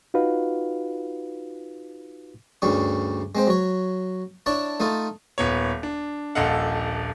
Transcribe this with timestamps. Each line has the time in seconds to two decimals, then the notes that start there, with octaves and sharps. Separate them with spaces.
0.14 D#4 F4 F#4 B4 F5
2.62 D2 G2 C#3 G3 C#6
3.35 G#3 C4 C5
3.47 F#3 C#5
4.46 D4 E4 C#5 A5
4.80 A3 D#4 F4 A4
5.38 D#1 B3 C#5
5.83 D4
6.35 D#1 A#1 A4 D#5 F5 F#5